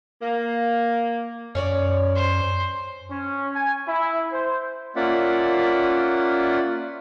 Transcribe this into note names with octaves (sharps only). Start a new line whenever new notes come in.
A#3
F#2 C#4 C#5 D5
C5
C#4
G#5
E4
C5
A#3 C#4 F4 D5 E5 F#5